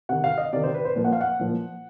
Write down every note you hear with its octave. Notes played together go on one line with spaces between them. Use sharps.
C3 D#3 F#5
F5
D#5
C3 D#3 D5
C5
B4
C5
A#2 F3
F#5
F5
F#5
A#2 F3